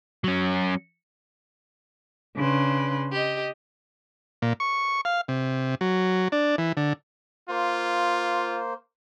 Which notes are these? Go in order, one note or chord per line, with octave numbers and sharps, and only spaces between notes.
F#3 C#4
C#3 D4 B4 C6
G4 D#5
A#2
C#6
F5
C3
F#3
D4
E3
D3
A#3 F4 C5